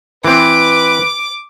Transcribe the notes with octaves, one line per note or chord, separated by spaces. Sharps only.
E3 C4 B4 D6